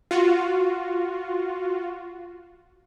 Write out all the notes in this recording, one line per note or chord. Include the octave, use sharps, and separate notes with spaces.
F4 F#4